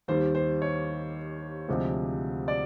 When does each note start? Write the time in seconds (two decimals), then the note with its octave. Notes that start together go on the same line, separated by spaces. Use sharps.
0.08 D#2 D#3 G3 C5
0.35 C5
0.62 C#5
1.68 D2 C3 F3 G#3
2.48 D5